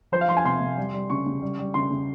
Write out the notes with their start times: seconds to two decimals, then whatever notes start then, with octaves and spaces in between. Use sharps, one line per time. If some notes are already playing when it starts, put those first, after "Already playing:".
0.12 F3 C5
0.21 F5
0.28 F3 C6
0.37 G#5
0.45 C3 C6
0.61 C3
0.77 G3
0.94 G3
1.10 C#3 C#6
1.26 C#3
1.42 G3
1.59 G3
1.74 C#3 C6
1.91 C#3